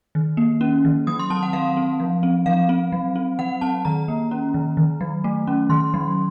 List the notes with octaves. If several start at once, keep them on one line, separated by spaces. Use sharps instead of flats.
D#3
A#3
C#4
D#3
F#3 D#6
C6
C4 A5
F#5
F#3 F5
C4
F3
C4
F3 F5
C4
F#3
C4
F#3 F#5
C4 A5
D#3 A#5
A#3
C#4
D#3
D#3
F#3
A3
C#4
D#3 C6
F#3